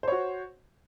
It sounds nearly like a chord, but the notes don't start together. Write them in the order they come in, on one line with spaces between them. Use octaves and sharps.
C5 C#5 F#4